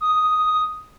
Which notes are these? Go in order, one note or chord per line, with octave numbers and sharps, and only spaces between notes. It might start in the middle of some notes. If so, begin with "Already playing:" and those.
D#6